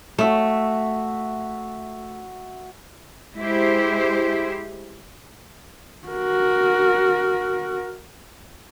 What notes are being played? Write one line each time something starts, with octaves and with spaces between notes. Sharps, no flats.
A3 F#4 E5 C#6
G#3 E4 G4 C5
F#4 A#4